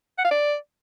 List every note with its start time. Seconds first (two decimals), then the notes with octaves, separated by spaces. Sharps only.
0.18 F#5
0.25 F5
0.31 D5